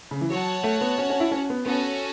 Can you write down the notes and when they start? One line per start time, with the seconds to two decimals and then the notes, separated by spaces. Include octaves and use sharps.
0.11 C#3
0.21 E3
0.30 F#3 F#4 C#5 F#5 A5
0.63 A3
0.81 B3
0.98 C#4
1.10 C#4
1.20 E4
1.32 C#4
1.50 B3
1.66 B3 C#4 F#4 A4 C#5